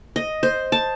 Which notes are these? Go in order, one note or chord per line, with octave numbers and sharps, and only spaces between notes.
D#5
C5
A5